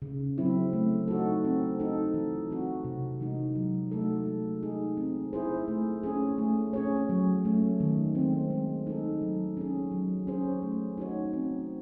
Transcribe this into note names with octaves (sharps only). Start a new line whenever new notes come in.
C#3
F#3 C4 E4
A3
D#4 F#4 A4
C4
D#4 A4
E3
C4 F#4
C3
E3 G#3 D#4
F#3
A3 D#4 F#4 A4
G#3
D#4 G#4
C4
E4 G#4 C5
A3
C#4 G#4
A3
C#4 G#4 C#5
F#3
A3 C#4
D#3
G#3 C4
G#3
D#4 A4
F#3
C#4 G#4
F#3
C#4 G#4 C5
A3
D#4 F#4 C#5
C4